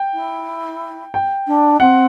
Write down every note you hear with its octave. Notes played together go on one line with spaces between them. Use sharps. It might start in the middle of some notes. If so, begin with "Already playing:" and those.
Already playing: G5
E4
G5
D4
C4 F#5